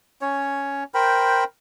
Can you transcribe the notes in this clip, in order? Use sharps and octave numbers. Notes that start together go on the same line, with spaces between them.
C#4 C#5
A#4 C5 G5 B5